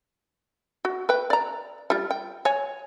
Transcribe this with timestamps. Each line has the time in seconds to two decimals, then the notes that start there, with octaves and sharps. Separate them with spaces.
0.85 F#4
1.09 B4 G5
1.30 D5 A#5
1.90 G3 F4
2.11 G5
2.45 C#5 G#5